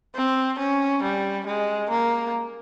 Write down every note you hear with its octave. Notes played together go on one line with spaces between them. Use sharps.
C4
C#4
G3
G#3
A#3